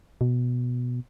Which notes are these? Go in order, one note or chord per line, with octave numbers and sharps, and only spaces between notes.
B2